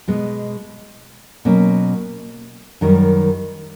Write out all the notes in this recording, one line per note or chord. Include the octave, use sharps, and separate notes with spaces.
B2 G#3 B3
B2 F#3 A#3 C#4
F#2 D#3 G3